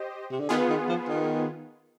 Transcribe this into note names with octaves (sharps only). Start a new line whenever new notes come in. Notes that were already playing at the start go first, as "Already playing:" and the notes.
Already playing: G4 C5 D#5
C3
D3
D#3 B3 F4 G#4
D#3
F3
D#3